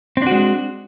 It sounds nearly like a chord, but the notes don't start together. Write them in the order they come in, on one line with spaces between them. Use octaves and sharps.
C4 D4 F#4 G#3